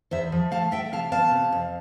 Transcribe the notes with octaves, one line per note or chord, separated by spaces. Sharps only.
E2 C5 E5
F3
A3 F5 A5
A3 E5 G5
C3 F5 A5
B3 F5 A5
C3
F2